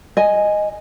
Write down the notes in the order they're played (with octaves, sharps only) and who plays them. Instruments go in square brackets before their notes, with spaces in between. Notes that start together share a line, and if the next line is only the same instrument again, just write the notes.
[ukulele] D#5 G#5